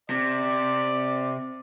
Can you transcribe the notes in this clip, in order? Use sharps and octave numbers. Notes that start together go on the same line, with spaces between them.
C3 D5